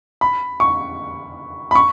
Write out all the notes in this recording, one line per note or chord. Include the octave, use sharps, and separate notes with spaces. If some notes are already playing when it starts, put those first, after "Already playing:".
B5
C#6
B5
C#6